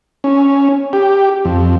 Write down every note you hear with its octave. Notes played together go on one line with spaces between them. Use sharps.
C#4
G4
F2